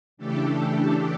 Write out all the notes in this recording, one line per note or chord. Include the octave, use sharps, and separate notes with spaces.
C#3 E3 A3 D4 G4 A4